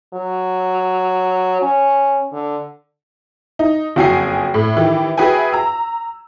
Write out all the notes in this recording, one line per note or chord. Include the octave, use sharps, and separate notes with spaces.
F#3
C#4
D3
D#4
F#1 F2 F#4 G5 G#5 C7
A2
D#3 E3 G4
F#4 G#4 B4 E5 G5 G#5
A#5 E6